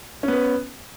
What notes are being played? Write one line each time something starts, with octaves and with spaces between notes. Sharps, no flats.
B3 C#4 B4